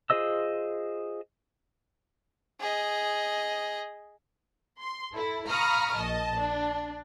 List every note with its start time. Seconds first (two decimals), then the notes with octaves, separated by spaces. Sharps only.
0.10 F4 G#4 C5 D#5 E6
2.61 G#4 D#5
4.79 C6
5.13 E4 A4
5.48 F5 A#5 B5 C#6 D#6 F6
5.97 A#1 D#5 A5
6.39 D4